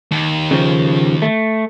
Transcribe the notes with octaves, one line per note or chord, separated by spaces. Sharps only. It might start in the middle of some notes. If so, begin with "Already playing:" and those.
D#2
C#3 F3
A3